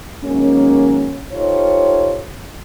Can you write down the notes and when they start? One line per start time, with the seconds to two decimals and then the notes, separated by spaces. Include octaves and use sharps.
0.23 D#3 F#3 G#3 A#3 C#4
1.32 D#4 F4 G4 A4 C5 C#5